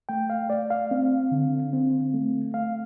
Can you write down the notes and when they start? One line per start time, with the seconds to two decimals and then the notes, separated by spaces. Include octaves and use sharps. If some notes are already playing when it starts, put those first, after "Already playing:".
0.09 A3 G5
0.30 F5
0.50 A3 D5
0.70 F5
0.91 C4
1.32 D3
1.73 C4
2.14 A3
2.54 A3 F5